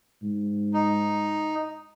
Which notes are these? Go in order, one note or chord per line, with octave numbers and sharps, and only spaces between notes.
G#2
D#4